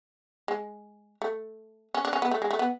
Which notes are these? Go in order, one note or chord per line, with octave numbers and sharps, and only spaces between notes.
G#3
A3
C#4
D4
C#4
B3
A3
G#3
A3
B3